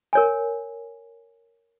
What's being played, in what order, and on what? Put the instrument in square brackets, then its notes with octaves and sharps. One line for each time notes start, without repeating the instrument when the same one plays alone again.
[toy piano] A#4 C#5 G#5